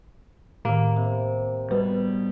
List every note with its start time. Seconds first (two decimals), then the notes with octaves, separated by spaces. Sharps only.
0.65 A2 D#3 A#3
0.96 C3
1.71 B2 G3 B4